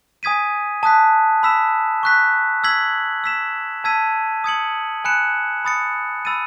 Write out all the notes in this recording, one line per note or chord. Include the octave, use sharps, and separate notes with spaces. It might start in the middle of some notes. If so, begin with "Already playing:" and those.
G#5 D#6 G#6 B6 D#7
A5 D#6 F#6 B6
B5 E6 B6 E7
C#6 F#6 B6
E6 G#6 B6 F#7
E6 B6 E7
A5 E6 G#6 B6 D#7
D#6 G#6 C#7 F#7
G#5 B5 F#6 C#7 E7
B5 D#6 A6 C#7
B5 E6 A6 D#7